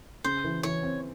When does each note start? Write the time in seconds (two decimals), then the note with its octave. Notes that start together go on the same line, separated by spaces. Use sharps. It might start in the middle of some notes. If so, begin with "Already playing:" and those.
0.24 C#3 C5
0.44 E3
0.63 E3 C#5
0.83 C4